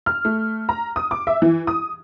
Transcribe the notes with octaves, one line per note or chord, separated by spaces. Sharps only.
F6
A3
A#5
D#6
D6
E5
E3
D#6